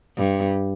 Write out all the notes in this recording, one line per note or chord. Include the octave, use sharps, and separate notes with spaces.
G2